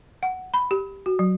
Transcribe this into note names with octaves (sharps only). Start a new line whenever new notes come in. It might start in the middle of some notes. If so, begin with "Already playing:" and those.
F#5
B5
G4
F#4
F#3